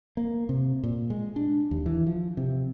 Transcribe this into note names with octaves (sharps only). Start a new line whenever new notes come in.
A#3
C3
A#2
G#3
D4
D#2
E3
F3
C3